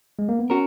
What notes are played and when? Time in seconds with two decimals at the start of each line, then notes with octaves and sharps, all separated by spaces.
0.19 G#3
0.29 A#3
0.39 B3
0.50 C#4 F#4 A#4